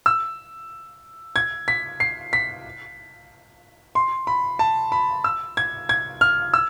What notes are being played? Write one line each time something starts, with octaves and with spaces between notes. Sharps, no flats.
E6
G#6
B6
C7
B6
C6
B5
A5
B5
E6
G#6
G#6
F6
E6